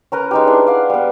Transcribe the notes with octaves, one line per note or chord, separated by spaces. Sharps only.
C#4 A#4 B4 A#5
G#3 D#4 G4
D4 E4 G#4
D5 F5 F#5
G3 B3